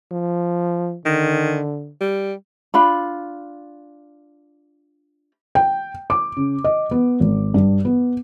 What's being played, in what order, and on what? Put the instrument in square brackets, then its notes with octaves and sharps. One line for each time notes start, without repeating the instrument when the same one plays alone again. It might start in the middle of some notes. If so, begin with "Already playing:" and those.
[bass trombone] F3
[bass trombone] D3 [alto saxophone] D#3
[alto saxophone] G3
[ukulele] D4 F4 B5
[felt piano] G5
D6
C#3
D#5
B3
G#1
G2
B3